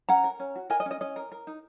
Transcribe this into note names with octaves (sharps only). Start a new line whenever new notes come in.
C#4 F#5 A#5
A#4
C#4
F#4
A#4 D#5 G#5
D#5
C#4
D#5
C#4 D#5
A#4
A#4
D#4